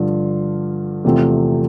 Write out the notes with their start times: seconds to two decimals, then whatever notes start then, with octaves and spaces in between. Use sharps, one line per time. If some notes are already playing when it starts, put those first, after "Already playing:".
Already playing: G2 D3 F3 F4
1.04 E2 C3 F3 A3 C4